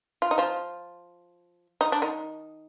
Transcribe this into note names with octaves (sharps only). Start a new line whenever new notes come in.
F4
D#4
F3 F4
D#4
D4
D#3 D#4